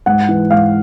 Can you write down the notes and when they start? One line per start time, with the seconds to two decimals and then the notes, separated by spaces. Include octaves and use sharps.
0.06 G#2 F#5
0.29 E3
0.50 G#2 F5